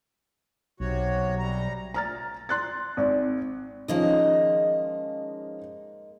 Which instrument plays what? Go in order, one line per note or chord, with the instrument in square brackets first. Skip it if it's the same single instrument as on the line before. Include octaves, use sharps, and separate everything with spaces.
[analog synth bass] B1 [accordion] C3 F#4 C#5
[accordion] C3 G3 A#5
[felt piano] A#5 F6 A6
C6 F#6 A6
G#1
[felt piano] D#3 F3 C#4 [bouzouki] G#3 A#3 D#5